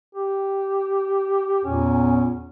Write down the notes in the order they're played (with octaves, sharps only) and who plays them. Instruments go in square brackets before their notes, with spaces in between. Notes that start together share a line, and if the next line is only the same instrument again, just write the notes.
[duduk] G4
[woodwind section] E2 A#2 [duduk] C#4